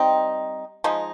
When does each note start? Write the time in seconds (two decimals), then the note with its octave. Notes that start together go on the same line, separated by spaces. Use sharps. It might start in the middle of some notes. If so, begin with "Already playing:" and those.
Already playing: G3 C4 D#4
0.84 F3 G#3 D#4